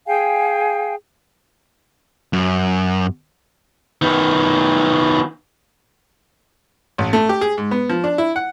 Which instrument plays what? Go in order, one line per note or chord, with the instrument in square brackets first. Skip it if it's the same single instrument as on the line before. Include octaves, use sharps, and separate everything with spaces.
[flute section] G#4 F5 G5 G#5
[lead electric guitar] F#2
D#3 B3
[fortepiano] A1
A3
G4
G#4
G#2
B3
F3
D4
E4
F#5